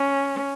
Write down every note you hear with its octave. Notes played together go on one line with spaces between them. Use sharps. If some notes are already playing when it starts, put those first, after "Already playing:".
Already playing: C#4